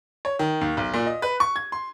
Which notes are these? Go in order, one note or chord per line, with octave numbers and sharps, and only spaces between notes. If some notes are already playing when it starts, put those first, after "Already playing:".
C#5
D#3
D#2
B1
A#2
D#5
B4
C#6
G#6
C6